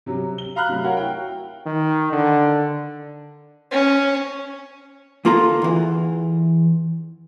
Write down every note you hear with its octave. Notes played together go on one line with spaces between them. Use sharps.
C3 F#3 G3
G7
F5 A#5 B5 F6 F#6
C3 F#3 A3
F#4 A#4 C#5 F5 F#5
E4 G5
D#3
D3
C#4
D2 A#3 F4 A4 A#5
E2 E3